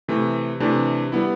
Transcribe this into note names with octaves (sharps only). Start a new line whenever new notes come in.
C3 E3 A3
C3 E3 A3 D4
G3 B3 E4